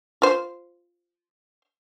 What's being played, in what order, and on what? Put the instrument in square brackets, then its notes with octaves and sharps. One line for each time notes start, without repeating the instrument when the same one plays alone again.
[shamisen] F4 C5